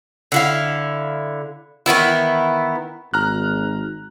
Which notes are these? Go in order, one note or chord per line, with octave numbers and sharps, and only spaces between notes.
D3 E4 F5
D#3 E3 B3 E4
G#1 A#5 F6 F#6